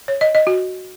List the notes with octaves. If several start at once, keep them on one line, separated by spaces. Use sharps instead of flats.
C#5
D#5
D#5
F#4